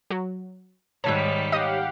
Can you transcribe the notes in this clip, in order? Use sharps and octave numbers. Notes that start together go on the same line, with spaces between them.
F#3 F#4
G#2 D#3 G3 C#5 A5 E6 F#6 B6
G4 D#5 F5 F#5 D#6